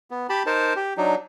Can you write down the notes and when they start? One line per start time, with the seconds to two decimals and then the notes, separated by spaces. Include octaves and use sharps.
0.11 B3
0.29 G4 A5 B5
0.46 D#4 A#4 C5 A5
0.76 G4
0.97 F#3 D4 D#4